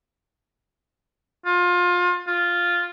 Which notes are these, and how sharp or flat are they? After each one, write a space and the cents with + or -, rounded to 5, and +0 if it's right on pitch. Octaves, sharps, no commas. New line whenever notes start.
F4 +25
F4 +0